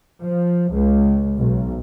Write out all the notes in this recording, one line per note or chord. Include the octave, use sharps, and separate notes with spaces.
F3
C#2
B1